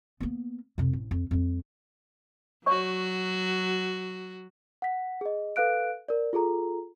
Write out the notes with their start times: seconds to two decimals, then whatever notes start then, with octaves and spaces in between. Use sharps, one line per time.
0.20 A#3 B3
0.78 F2 C3
0.93 A1
1.11 F2
1.31 F2 G3
2.66 F#3 F#4 C#5 D5 C#6
4.82 F#5 B6
5.21 G#4 D#5
5.56 A4 B4 F5 F#6 D7
6.09 A#4 D5
6.33 F4 G#4 A4 A#5